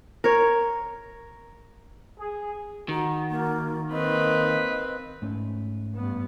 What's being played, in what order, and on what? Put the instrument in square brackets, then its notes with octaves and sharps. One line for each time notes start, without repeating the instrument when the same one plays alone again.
[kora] A#4 C#5
[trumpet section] G#4
[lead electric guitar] D#3 [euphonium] F#4 [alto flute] A#5
[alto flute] A#3
[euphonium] A#3 [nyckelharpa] C4 B4 [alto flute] D#5
[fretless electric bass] G#2 A3 C#4
[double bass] G2 B3